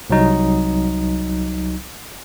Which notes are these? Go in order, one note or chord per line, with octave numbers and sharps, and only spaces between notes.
C2 F#3 D#4